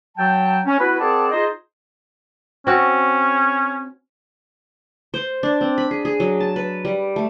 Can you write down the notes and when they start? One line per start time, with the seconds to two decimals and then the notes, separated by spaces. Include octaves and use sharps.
0.17 F#3 G5 A5
0.66 C#4
0.79 B3 E4 F#4 B4
0.99 C4 G#4 A#4 D5 F#5 A5
1.32 D#4 F4 G#4 C5 D#5
2.67 C4 C#4 F#4
5.14 C5
5.43 D4
5.61 C4
5.78 B5
5.91 G#4
6.05 G#4
6.20 F#3
6.40 A5
6.56 B4
6.85 G3
7.16 A3